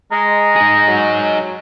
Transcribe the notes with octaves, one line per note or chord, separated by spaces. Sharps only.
G#3 A#5
D#4 G#4
F#3